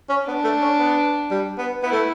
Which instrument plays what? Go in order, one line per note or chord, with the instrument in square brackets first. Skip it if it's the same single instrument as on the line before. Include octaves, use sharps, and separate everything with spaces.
[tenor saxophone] C#4
[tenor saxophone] B3 [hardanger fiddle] D4
[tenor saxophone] A3
C#4
B3
G3
B3
[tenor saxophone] B3 [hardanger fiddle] E4
[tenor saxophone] A3